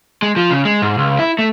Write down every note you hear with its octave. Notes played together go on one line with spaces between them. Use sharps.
G#3
F3
C#3
G#3
G#2
C#2
E4
A3